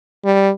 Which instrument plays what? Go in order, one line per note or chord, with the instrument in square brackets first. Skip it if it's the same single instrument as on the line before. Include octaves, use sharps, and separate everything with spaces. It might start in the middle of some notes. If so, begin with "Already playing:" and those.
[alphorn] G3